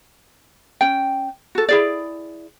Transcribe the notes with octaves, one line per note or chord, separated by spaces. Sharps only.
C#4 G5
F#4 A4
E4 G#4 D5